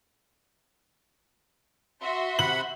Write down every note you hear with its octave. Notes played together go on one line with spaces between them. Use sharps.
F#4 E5 C6
C3 F#5 B5 F#7